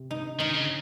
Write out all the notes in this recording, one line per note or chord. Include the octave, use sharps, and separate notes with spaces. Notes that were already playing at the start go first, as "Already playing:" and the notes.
Already playing: C3
D#4
D#3 D#4
C#3